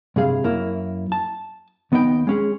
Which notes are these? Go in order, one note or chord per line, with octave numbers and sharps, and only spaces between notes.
G2 C3 G#4 F5
F#2 A#3 E4
A5
D#2 B3 D#4 D#5 G5
G#3 C#4 G#4